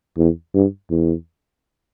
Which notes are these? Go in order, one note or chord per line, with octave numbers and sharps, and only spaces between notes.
E2
G2
E2